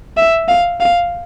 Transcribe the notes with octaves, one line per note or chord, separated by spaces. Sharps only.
E5
F5
F5